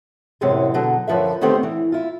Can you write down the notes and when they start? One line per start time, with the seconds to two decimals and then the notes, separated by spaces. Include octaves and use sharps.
0.41 F#2 A2 C3 E3 F#3 G#3
0.74 B2 D3 F#3
1.08 F#2 D3 F3 B4 E5
1.41 D3 D#3 G3 A3 B3 C4
1.63 E3
1.92 E4 F4